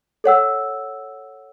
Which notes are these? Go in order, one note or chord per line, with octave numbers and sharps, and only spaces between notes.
A4 C#5 F#5 E6